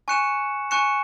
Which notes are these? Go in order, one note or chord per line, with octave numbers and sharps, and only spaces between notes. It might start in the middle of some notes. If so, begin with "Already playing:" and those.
G#5 C#6 F#6 C#7 E7
G#5 C#6 F#6 C#7 E7